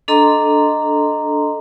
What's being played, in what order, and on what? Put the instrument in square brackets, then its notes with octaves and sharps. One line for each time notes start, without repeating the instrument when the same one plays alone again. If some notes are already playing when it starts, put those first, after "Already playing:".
[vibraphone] D4 A4 D#5 A#5 C6